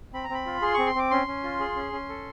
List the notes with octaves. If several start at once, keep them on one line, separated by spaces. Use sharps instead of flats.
C4 B5
A#5
C4 B5
F4
G#4 C6
C4 C#6
C6
C4 D6
C#4 C6
C#4
F4
G#4
C#4
C#4
A4